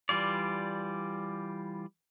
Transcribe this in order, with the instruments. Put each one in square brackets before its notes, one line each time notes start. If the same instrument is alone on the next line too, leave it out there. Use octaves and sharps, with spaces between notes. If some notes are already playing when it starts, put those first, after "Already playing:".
[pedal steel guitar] E3 G3 F4 D5